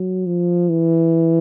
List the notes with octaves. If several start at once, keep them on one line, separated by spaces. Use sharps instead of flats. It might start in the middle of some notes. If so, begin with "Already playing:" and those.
Already playing: F#3
F3
E3